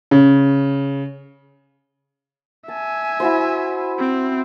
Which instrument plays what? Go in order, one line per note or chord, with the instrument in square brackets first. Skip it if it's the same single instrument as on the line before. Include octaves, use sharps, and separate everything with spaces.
[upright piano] C#3
[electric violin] E5 G#5 [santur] A5
[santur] E4 F#4 C5
[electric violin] C4